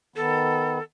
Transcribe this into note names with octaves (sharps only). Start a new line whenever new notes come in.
D#3 B3 A4